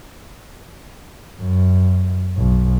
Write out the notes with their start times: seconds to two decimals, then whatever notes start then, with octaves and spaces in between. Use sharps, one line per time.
1.40 F#2
2.37 B1